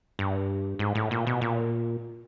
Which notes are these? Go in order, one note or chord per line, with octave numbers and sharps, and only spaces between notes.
G2
G#2
A2
A#2
B2
A#2